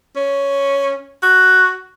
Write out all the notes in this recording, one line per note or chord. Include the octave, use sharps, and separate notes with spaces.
C#4
F#4